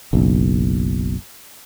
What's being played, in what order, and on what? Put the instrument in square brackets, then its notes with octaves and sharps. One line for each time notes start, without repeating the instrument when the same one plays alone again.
[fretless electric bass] F#1 B1